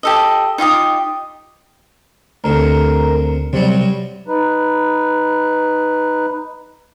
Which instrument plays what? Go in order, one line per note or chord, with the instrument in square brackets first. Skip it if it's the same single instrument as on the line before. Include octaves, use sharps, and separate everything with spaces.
[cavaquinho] G4 A4 D#5
D#4 F4 G4 D#6
[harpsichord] D2 C3 [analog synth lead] A#4
[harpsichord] F#2 F#3 G3 [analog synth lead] C3
[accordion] D#4 B4